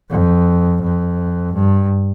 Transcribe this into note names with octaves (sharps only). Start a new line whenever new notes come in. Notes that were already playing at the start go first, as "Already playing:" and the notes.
F2
F2
G2